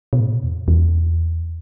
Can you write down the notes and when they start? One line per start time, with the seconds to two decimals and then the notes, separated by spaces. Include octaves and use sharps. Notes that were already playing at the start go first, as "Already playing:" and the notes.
0.13 B2
0.20 A2
0.29 B2
0.43 E2
0.68 E2